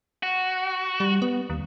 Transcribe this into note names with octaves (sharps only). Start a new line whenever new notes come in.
F#4
G3
B3
D#2